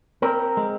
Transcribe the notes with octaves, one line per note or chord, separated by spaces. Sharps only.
C4 A#4
G#3